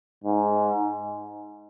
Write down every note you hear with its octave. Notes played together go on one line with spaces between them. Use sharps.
G#2